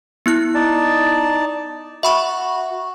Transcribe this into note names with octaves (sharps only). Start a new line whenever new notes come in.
B3 E4 F#6
D#4 D5 A5
F#4 E5 B5 C#6